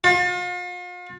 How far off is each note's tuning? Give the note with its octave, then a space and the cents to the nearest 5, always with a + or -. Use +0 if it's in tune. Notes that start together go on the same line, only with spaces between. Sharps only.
F4 +40